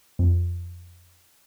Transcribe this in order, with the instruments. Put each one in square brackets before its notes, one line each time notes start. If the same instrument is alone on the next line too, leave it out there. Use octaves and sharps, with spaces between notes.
[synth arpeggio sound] F2